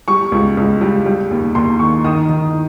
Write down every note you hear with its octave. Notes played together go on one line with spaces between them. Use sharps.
G3 C#6
C#2
C#2
G3
G3
D#2
D#2 C6
D#3 C#6
D#3 D#6
D#3